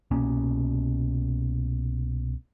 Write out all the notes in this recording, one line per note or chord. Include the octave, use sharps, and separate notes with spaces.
C2 B2 A#3 C#4